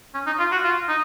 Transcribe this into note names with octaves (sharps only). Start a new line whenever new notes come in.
C#4
D#4
F4
F#4
F4
D#4